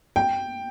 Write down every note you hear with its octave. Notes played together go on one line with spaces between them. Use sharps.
G5